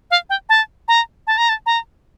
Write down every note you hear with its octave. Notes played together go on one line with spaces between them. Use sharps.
F5
G5
A5
A#5
A5
A#5
A5
A#5